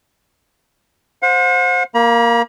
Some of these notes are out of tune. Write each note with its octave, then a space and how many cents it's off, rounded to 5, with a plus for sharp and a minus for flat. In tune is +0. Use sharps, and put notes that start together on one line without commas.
C5 +0 F#5 -45
A#3 +0 A#5 +45